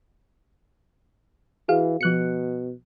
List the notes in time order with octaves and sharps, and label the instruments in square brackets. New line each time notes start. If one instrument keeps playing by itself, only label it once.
[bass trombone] E3 [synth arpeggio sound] F#4 G#4 F5
[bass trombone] B2 [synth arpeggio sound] F3 F#6 C#7